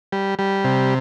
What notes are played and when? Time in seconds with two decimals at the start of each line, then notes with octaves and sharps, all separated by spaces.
0.12 G3
0.39 G3
0.64 C3